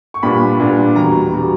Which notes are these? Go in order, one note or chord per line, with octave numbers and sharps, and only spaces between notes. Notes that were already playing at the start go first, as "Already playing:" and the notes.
C#6
A#2 G3 B3 D4 B5
A#2 G3 B3 D4
E2 B2 G3 A#5
B2 G3